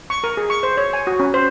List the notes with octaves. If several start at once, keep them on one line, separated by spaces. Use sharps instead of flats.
C#6
A#4
G#4
C#6
C5
C#5
G#5
F#4
C#4
C5